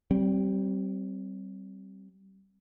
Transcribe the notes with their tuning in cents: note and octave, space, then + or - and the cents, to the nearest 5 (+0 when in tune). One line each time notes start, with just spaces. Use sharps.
G3 -25 C4 +10